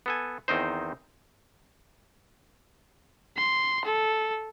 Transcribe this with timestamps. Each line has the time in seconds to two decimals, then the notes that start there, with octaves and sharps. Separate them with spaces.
0.06 B3 A4 G#5
0.48 E2 D#3 C4 D#4 C5
3.37 C6
3.85 A4